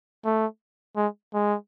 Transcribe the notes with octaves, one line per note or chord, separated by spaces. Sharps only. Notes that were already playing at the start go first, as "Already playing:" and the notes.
A3
G#3
G#3